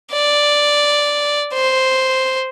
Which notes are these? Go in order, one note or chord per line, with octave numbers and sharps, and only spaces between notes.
D5
C5